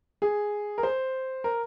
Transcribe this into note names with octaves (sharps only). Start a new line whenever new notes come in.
G#4
A#4
C5
A#4